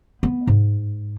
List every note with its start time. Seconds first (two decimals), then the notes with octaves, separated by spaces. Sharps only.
0.23 B3
0.47 G#2